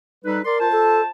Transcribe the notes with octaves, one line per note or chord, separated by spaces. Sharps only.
G3 D#4 A4 B4
A#4 D5 C6
F4 C5 A5
A4